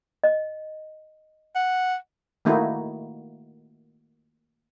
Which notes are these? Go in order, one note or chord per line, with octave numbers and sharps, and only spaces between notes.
D#5
F#5
D#3 A3 A#3 D#4 E4 F#4